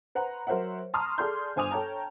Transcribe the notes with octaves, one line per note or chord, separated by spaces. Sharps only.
B4 C5 F#5 A#5
F#3 A#4 C5 C#5 E5 F#5
A5 A#5 C6 C#6 D#6 F6
G#4 A4 D5 C6 G6
G1 C5 G#5 D6 D#6 F7
A4 C#5 G5 A5 A#5